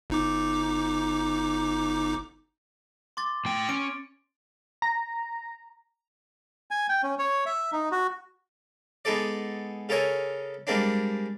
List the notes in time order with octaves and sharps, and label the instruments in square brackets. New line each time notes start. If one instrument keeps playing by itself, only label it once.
[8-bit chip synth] G1 D#4 D6
[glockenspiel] C6 D6 A6
[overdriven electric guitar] A2 G5
[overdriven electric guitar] C#4 [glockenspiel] D7
[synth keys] A#5
[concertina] G#5
G5
C#4
C#5
E5
D#4
F#4
[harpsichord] G#3 B3 D#4 A4 D5
C#3 A4 A#4 C#5 D#5 G#5
G3 G#3 A#3 C4 D4